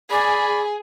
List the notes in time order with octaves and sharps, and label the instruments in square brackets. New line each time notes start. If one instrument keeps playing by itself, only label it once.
[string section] G#4 [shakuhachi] D5 [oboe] B5